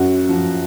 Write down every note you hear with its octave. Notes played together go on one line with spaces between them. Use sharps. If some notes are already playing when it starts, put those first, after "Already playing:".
Already playing: F#2 F#4
F3